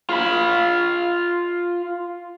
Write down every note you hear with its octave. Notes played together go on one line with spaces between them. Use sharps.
F4 B5